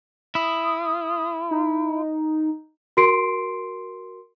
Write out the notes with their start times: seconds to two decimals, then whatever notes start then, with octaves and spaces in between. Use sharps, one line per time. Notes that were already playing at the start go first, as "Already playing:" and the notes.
0.35 E4 D#6
1.51 D#4
2.97 F#4 A#4 C6 C7 D7